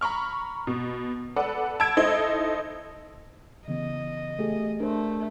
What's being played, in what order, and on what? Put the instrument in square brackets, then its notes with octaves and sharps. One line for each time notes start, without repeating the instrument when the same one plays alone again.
[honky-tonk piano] A#5 B5 C#6 F6
B2
A4 B4 D5 F#5
A5 B5 E6 G#6 D7
D#4 E4 A4 C5 D#5
[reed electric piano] C#3 E3 B3 [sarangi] D#5
[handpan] A3 G4 G#4
[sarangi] A3 [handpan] D4 C5 [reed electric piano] A#4